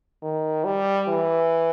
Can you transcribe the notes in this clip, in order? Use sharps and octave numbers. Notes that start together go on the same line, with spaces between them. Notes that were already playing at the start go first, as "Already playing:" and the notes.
D#3
G3
E3